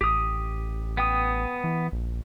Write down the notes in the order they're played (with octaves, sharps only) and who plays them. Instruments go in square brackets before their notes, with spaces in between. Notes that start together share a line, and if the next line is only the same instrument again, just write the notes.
[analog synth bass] A1 [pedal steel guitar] G4 D#6
[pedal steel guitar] B3 G5 D#6
[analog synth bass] E3
A#1